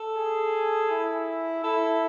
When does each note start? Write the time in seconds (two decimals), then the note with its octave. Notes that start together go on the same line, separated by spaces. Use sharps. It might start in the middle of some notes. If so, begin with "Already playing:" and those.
Already playing: A4
0.17 G#4
0.91 E4
1.64 E4 A4